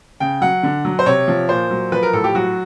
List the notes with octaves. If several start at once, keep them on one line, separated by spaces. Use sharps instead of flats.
C#3 G5
F#3 F#5
D3
F#3
C5
C3 C#5
F3
A#2 C5
F#3
F3 B4
A#4
A2 A4
G4
F#3 F#4